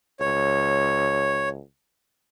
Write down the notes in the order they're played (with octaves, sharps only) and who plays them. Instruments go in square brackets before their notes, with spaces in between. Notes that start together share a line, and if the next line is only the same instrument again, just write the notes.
[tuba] C#2 [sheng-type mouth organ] C#5